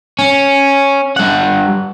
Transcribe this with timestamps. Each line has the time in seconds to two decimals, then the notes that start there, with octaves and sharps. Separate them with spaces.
0.19 C#4
1.17 G2 F#5